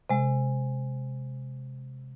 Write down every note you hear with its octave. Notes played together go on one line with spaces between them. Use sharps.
C3 G#3